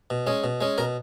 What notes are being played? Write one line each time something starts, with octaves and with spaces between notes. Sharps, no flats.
B2
G#3 C#4
B2
G#3 C#4
B2 A#4